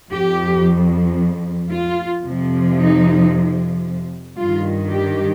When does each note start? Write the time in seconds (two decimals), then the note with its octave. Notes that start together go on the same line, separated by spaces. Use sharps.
0.11 F2 F3 G4
1.71 F4
2.24 F2 C3 F3
2.77 D#4
4.37 G2 D#3 F4
4.91 G4